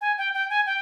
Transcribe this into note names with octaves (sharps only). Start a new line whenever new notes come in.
G#5
G5
G5
G#5
G5